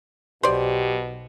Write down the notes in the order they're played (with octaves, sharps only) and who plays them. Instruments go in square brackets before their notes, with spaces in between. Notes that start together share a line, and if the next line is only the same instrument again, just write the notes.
[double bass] B1 [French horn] B2 [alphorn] G4 [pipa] C5 D5